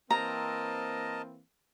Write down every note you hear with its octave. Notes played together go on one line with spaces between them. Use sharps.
E3 A#3 C4 A#4 D#5 A5 A#5